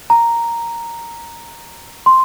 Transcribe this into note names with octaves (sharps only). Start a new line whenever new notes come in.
A#5
C6